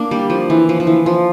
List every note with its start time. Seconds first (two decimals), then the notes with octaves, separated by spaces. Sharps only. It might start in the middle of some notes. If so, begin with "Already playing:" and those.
Already playing: A#3 D4
0.11 G3
0.30 F3
0.50 E3
0.69 F3
0.80 F3
0.87 E3
1.06 F3